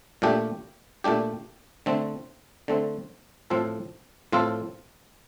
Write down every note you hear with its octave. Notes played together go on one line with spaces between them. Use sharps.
A#2 A3 D4 G4
A#2 A3 D4 G4
D3 A3 C4
D3 A3 C4
A2 F3 C4 F4 A4
A2 F3 C4 F4 A4